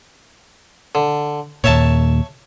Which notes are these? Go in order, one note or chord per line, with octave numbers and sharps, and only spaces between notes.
D3
D#2 A#2 C#5 E5 A5